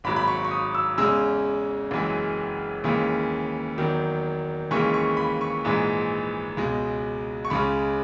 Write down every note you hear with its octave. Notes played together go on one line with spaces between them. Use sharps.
G#1 G#2 F#3 B5
B5
C#6
C#6
D#6
E6
E2 C#3 G#3 E6
F#1 F#2 E3 G#3
D#2 C#3 E3 G#3
E2 D#3 F#3
D#2 C#3 E3 G#3 C#6
C#6
B5
C#6
A#1 G#2 E3 G#3
C#2 B2 G#3
C#6
C#2 C#3 G#3 B5